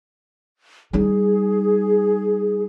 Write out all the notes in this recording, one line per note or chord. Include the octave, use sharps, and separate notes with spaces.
G3 D#4 G#4